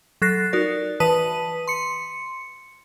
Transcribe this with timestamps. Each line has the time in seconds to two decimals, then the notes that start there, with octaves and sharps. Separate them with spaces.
0.22 F#3 A4 F#6 A6 A#6 C7
0.53 D#4 F#4 A#4 D5
1.00 E3 B4 A5 D#6 B6 D#7
1.68 C6 C#7